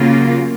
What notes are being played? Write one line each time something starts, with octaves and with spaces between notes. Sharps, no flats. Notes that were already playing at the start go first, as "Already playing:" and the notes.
Already playing: C#3 F#3 A#3 F4